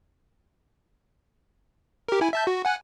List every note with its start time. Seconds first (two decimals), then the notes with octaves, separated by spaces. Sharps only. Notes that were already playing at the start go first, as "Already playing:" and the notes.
2.08 G4 A#4
2.21 E4 G#5
2.33 E5 A5 G6
2.47 F#4
2.65 F#5 G#5 F#6